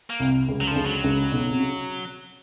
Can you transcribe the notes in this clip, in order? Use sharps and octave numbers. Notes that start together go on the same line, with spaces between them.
A#3
C2 C3
C#2 C#3
F#3
D3 F3
C#2 C#3
F#3
C#2 C#3
B1 B2
C3
C#3